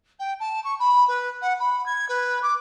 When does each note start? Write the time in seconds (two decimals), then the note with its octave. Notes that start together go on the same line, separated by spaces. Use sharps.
0.19 G5
0.40 A5
0.64 C#6
0.79 B5
1.08 B4
1.41 F#5
1.59 B5
1.86 G#6
2.08 B4
2.42 D6